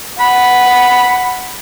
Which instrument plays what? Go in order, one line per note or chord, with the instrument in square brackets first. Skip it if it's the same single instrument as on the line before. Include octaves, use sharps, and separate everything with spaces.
[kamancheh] F#5 [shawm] B5